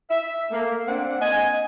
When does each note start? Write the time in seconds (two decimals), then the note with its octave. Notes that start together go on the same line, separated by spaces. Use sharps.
0.11 E5
0.51 A3 A#3
0.88 A#3 C4 D4 F#5
1.21 D#5 G#5